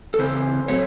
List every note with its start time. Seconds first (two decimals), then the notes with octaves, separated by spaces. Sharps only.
0.14 A4
0.18 C#3 E3 C4 C5
0.68 A2 F#3 A3 C4 C#5